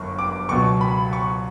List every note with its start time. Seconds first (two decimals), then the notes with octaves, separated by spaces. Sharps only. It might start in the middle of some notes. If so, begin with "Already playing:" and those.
Already playing: G1 F#2 C#6
0.19 D6
0.49 C#2 B2 F#3 C#6
0.81 B5
1.13 C#6